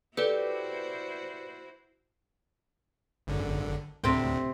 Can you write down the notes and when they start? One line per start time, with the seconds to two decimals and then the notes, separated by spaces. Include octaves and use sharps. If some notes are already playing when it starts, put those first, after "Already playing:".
0.17 E4 F#4 G4 A4 B4 C5 D5
3.27 G#1 F#2 D3
4.04 D2 A2 C3 C5 G5